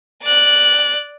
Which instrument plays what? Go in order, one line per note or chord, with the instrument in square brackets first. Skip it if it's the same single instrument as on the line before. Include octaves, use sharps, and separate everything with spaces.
[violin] D5 F#6